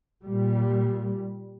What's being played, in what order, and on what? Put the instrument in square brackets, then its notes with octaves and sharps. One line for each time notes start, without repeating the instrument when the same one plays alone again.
[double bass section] A#2 G3